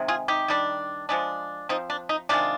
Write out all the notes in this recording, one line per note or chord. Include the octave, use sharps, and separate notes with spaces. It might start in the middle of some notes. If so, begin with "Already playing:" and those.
Already playing: C3 D#3 G#3 C4
F4 G#4
D#4 G4
D#3 G3 D4
F3 G#3 D4
F3 C4 D#4
D4
D#4
C3 D#3 G#3 D4 F4